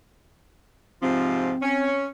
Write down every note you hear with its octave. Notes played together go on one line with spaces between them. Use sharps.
G#2 C3 F3 C4
C#4